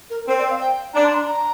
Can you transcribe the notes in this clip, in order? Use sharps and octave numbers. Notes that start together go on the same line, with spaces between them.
A#4
C4 A#4
D5
F5
G5
D4 A#5
C6
A#5
A#5